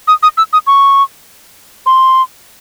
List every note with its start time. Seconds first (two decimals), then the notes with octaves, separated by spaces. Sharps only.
0.08 D#6
0.23 D#6
0.37 E6
0.53 D#6
0.67 C#6
1.86 C6